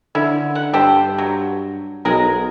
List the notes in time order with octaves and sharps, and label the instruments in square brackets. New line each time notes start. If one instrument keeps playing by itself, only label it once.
[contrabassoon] D3 [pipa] C#4 E4
[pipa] F#5
[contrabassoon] G2 [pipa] G4 A4 C5
[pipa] F#3
[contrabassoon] B1 [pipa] G#3 G#4 A#4